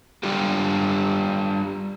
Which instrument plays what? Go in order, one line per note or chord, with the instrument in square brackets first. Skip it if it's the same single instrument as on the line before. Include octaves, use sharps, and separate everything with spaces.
[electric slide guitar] G3 D4 F4 G4